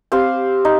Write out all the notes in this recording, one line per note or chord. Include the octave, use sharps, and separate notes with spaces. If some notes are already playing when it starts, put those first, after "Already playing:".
C4 G4 C5 F5
D#4